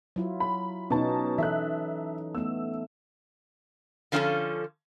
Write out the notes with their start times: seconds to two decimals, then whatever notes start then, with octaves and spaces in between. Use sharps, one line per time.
0.16 F#3 E4 F4
0.40 B5
0.90 B2 C#4 D#4 A5
1.38 E3 A4 E5 F#6
2.35 A3 B3 E6
4.12 D3 F3 C#4 D4 F4 A4